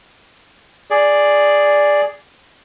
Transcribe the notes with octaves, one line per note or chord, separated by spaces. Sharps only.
G#4 D5